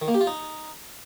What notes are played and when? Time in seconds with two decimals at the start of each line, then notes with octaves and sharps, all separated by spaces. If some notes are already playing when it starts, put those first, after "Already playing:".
0.02 D#3
0.08 A#3
0.14 G4
0.21 F4
0.27 D#4